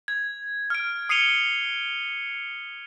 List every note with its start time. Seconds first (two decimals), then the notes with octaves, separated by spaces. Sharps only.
0.08 G#6
0.70 F6 D7
1.09 D#6 C7 C#7 D#7 F7 G7